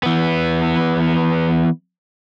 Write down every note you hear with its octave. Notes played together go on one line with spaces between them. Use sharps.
E3 B3